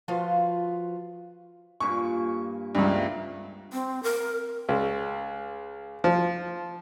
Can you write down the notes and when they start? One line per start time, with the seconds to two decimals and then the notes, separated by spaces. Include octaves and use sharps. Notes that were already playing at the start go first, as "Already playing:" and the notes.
0.08 F3 F4 F#4 B4 F5
1.80 G2 A#2 G#5 C#6
2.75 C#2 G2 E3 F3 A#3
3.73 C4
4.03 A#4
4.69 C#2
6.04 F3